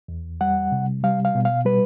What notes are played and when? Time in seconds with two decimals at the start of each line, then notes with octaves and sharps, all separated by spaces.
0.08 E2
0.41 G3 F#5
0.72 C3
1.04 G3 F5
1.25 F5
1.35 B2
1.45 F5
1.65 G3 B4